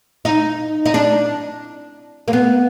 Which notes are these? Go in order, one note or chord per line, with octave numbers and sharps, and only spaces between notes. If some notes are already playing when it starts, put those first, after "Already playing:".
D#4
D#4
D4
A#3
B3